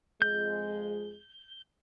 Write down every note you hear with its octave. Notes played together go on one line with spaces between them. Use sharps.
F2 G#3 G6